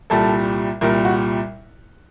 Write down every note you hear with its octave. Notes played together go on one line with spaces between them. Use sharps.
C2 A#2 G3 A4
C2 A#2 G3 A#4
F#4